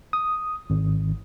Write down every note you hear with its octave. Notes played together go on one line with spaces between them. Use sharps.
D#6
G#1